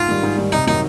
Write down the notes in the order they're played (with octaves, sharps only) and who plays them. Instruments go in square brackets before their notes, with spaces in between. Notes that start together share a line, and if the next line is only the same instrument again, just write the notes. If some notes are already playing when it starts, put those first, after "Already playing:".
Already playing: [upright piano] G#2 [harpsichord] F4
[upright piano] D#3 G3
G#2
D#3 G3
[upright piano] C3 [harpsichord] D#4
[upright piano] D#3 F#3 [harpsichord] D#4